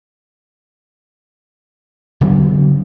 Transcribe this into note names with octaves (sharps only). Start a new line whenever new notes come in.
C#3 F#3 B3 C4